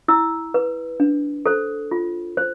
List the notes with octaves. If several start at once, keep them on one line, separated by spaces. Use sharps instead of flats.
E4 E6
B4
D4
A4 C5
F4
C5